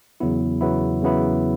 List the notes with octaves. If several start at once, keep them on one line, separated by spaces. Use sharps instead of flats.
E2 C#3 F#3 B3 E4
E2 C#3 F#3 B3 E4
E2 C#3 F#3 B3 E4